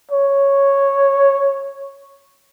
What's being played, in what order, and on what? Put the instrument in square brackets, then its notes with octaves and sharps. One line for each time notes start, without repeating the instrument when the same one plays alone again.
[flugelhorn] C#5